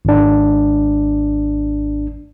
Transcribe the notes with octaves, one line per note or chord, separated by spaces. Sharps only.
G#1 D4